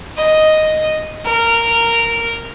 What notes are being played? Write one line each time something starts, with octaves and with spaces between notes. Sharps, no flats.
D#5
A#4